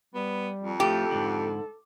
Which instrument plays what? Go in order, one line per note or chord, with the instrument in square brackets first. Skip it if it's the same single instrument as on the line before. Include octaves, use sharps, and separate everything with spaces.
[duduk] G3 [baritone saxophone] B3
[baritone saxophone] F2
[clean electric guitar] A2 F3 A3 [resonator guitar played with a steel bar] G4 [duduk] A4
[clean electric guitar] G#2 D3